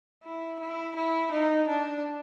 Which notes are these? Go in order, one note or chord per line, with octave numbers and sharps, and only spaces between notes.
E4
E4
E4
D#4
D4